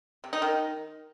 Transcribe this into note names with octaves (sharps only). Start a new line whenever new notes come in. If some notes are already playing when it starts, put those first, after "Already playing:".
C3
D#4
D#3